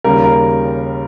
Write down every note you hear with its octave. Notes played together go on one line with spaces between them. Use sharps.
D#2 C#3 G3 A#4
A#4